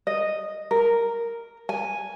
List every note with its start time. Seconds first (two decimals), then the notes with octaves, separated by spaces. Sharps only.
0.07 D#5
0.71 A#4
1.69 G#5